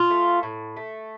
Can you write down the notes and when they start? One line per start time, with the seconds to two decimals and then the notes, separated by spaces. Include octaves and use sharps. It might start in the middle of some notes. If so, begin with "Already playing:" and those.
Already playing: F4
0.10 A3
0.43 A2
0.77 A3